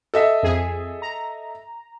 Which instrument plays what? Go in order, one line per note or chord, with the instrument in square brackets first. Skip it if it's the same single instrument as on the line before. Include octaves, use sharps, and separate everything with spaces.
[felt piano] A4 D#5 E5
[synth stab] F2 G#4
A#5